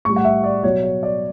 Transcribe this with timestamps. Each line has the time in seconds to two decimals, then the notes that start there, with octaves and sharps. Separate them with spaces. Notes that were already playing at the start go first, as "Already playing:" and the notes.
0.05 A2 G3 C#6
0.16 F#5
0.24 E5
0.44 D5
0.63 B2 F#3 C#5
0.84 C#5
1.03 D5